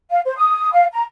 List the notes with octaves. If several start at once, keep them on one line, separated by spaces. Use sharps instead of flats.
F5
C5
D#6
F5
A#5